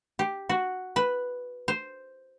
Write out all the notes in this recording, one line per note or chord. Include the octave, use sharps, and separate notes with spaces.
G4
F#4
B4
C5